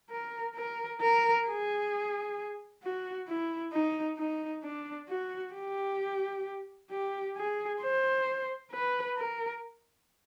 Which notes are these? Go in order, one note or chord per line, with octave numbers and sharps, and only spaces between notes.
A#4
A#4
A#4
G#4
F#4
E4
D#4
D#4
D4
F#4
G4
G4
G#4
C5
B4
A#4